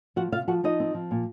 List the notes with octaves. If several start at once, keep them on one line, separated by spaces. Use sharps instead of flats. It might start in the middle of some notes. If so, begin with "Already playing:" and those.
F3 F#4 F#5
C3 F4 F5
F3 F#4 F#5
F3 D#4 D#5
C4
F3
A#2